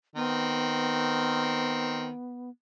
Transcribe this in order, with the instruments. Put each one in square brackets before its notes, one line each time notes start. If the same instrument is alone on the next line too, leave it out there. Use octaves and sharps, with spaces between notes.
[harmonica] D#3 C4 [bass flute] B3